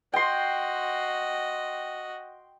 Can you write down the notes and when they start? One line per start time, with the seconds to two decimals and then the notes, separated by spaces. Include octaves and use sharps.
0.13 F#4 D#5 G5 C6